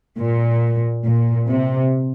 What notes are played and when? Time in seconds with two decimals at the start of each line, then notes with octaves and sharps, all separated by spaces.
0.18 A#2
1.05 A#2
1.48 C3